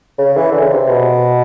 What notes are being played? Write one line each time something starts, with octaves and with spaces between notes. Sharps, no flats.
C#3
E3
D3
C#3
C3
B2